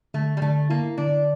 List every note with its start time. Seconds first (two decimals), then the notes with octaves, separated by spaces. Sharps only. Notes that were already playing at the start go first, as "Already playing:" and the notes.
0.14 D3 A3
0.37 G3
0.42 D3 A3
0.70 A#3 E4
0.98 D3 D4